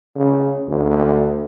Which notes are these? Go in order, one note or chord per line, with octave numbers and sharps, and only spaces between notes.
C#3
D2